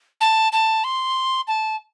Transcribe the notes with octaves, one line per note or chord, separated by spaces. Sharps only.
A5
A5
C6
A5